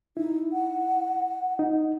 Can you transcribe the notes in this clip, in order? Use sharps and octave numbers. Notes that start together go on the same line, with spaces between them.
D#4 E4
F#5
D#4